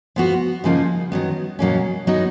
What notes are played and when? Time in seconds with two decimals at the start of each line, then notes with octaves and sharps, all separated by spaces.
0.16 F3 B3 F#4
0.64 C#3 F3 A#3 D#4
1.12 D#3 F#3 B3
1.59 B2 F#3 A#3 C#4
2.07 F#3 B3 D#4